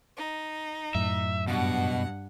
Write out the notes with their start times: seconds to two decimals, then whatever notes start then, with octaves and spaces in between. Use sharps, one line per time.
0.17 D#4
0.95 F#2 A2 E5
1.48 G2 B2 F#5